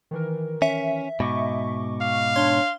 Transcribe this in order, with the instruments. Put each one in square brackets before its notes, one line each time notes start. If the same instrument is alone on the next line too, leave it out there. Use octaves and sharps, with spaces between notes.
[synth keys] D#3 E3 A#4
[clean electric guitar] C#4 [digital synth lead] E5
[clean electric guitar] G#2 B2 [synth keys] D#5 C#6 D6
[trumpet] F5
[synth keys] D4 C#5 [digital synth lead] C6